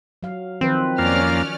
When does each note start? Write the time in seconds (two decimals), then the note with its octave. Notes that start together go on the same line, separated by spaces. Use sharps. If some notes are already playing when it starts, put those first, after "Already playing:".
0.23 F#3 F5
0.61 D#3 F3 C4 B4
0.98 F2 A#3 C#4 D5 F5 F6